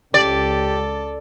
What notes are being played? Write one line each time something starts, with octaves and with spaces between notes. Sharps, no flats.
C#2 G4 A4 D5